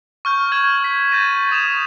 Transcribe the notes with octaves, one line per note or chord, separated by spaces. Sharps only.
C#6 F6 G6
F6 G#6 E7 F#7
F6 B6
G6 A6 A#6 D#7
C#6 D#6 E7 F7